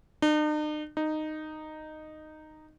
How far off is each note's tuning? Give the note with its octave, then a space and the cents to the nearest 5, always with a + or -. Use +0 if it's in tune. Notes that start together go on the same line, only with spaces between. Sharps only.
D#4 -45
D#4 -10